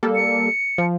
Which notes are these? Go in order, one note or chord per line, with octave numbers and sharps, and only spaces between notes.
G3 A#3 A4
C#7
F3